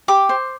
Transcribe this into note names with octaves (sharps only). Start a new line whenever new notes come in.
G4 D6
C5